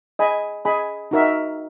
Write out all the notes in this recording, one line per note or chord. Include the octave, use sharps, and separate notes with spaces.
G#4 D#5 G#5 B5
G#4 D#5 G#5 B5
D#4 F#4 A#4 E5